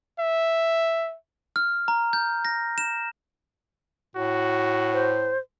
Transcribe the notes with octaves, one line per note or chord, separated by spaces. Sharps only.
E5
F6
A#5
G6
A#6
E7
A2 F#4
C5